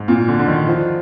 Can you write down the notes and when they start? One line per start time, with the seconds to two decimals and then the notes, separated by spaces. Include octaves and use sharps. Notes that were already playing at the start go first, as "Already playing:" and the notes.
Already playing: G#2
0.08 A#2
0.28 D3
0.39 D3
0.47 D#3
0.68 F3